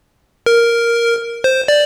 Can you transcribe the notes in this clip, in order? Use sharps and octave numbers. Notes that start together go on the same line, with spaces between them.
A#4
C5
D5